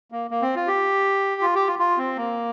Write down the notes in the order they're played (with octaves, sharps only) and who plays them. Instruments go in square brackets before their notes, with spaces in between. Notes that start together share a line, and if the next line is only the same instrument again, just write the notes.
[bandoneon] A#3
A#3
C4
F4
G4
F4
G4
F4
F4
C4
A#3